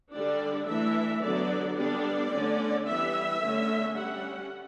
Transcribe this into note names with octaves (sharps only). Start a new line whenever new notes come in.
D3 G3 D4 D5
E3 A3 D4 E5
D3 F#3 B3 D4 D5
D3 G3 B3 D4 D5
D3 A3 C#4
E3 G3 B3 E5
D3 A3 C#4
G3 C#4 F#5